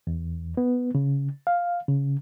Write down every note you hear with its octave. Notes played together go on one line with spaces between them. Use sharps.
E2
B3
C#3
F5
C#3